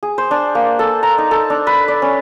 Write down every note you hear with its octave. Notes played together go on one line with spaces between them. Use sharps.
G#4
C5
D4
A#3
A4
A#5
D#4
A4
D4
B4
D5
C#4